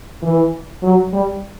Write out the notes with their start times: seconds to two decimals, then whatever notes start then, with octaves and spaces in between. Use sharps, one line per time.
0.23 E3
0.83 F#3
1.13 G3